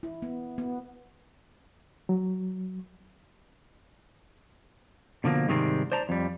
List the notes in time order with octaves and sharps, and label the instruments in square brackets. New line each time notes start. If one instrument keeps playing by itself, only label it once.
[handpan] E4
B3
B3
[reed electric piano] F#3
[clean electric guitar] B2 D3 F3 A#3
G#2 C3 D#3 G3 G#3 C4
C5 D5 A5 A#5
F2 G3